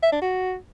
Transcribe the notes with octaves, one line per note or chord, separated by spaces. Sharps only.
E5
D4
F#4